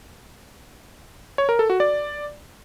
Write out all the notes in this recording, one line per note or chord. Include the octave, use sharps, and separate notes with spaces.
C#5
A#4
A4
F#4
D5